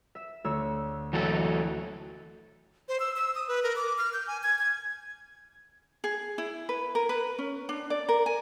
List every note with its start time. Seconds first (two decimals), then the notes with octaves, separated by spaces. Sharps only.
0.15 E5 E7
0.44 D2 C#5 E6
1.13 E3 F#3 A4 E5 F#5
2.88 C5
3.00 E6
3.16 E6
3.35 D#6
3.48 B4
3.63 A#4
3.76 D6
3.98 F6
4.13 G6
4.27 G#5
4.44 G#6
4.59 G#6
6.04 G#4
6.38 E4
6.69 B4
6.95 A#4
7.09 B4
7.38 C#4
7.69 D4
7.90 D5
8.09 A#4
8.26 G#5